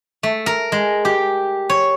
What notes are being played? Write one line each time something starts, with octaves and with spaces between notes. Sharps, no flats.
A3
A#4
G#3
G4
C#5